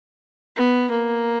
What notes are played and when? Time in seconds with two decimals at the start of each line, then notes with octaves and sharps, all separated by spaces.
0.56 B3
0.91 A#3